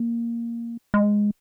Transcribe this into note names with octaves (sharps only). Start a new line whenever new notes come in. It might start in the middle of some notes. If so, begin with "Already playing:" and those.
Already playing: A#3
G#3